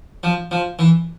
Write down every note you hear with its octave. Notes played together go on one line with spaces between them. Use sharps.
F3
F3
E3